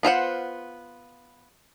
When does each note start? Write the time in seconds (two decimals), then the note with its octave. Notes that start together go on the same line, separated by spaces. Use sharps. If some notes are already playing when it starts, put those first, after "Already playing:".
0.03 B3 F4 C5 F#5